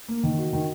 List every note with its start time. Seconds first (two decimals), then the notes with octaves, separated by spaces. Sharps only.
0.08 A#3
0.23 D#3
0.38 F#4
0.53 D#3